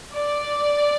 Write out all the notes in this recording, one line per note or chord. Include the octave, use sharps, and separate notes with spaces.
D5